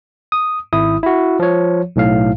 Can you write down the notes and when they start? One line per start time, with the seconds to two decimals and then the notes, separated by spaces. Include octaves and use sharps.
0.32 D#6
0.73 G#1 E4 D#6
1.03 E4 F#4
1.40 F3 C#5
1.96 B1 A2 F5